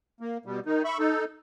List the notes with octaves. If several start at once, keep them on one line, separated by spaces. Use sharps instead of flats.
A#3
B2 G3
D#3 D#4
E5 B5 C#6
D#4 A4